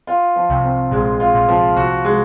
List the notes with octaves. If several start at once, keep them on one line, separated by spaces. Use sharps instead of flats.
F4
F3
C2 C3
C4
A#1 A#2 G#3
F4
A#1 A#2
F3
C2 C3 F#4
G#3